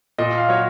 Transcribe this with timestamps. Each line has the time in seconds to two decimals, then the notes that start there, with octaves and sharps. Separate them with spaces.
0.18 A#2 D#5
0.38 F5
0.49 F#3 C#5